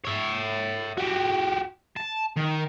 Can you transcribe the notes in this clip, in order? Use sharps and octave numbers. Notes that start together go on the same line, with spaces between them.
C#5 E5
F#4 G4
A5
D#3